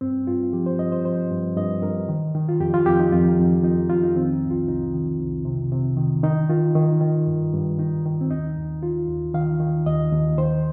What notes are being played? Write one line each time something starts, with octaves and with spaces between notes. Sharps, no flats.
G2 C4
G2 F4
F3 G4
C5
G2 D#5
C5
F3 C5
G2
G2 D#5
G2 A#4
D#3
D#3
F4
F2 G4
F4
F2 G4
D#4
F2 F4
F2
F2 D#4
F2 F4
D#4
D#3 C4
D#4
C2
F4
C2 D#4
D#3
C2
C3
C3
D#3
D#3 D#4
D#3 F4
D#3
D#3
G2
G2
D#3 D#4
D#3
C4
D#2 D#4
D#2
D#3 F4
D#2
D#3 F5
D#3
D#2 D#5
D#2
D#3 C5